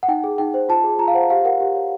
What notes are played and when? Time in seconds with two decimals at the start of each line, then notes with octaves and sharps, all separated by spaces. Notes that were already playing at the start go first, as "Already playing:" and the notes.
0.03 F#5
0.08 D#4 G5
0.24 G#4
0.38 D#4 G5
0.54 C5
0.69 F4 A5
0.84 G#4
0.99 F4 A#5
1.08 F5
1.14 C5 F#5
1.30 G4 F5
1.45 A#4 F#5
1.60 G4
1.75 C#5